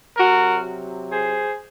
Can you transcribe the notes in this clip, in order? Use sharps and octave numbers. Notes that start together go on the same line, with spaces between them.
C3 F#3 F#4 A#4
G#4 C5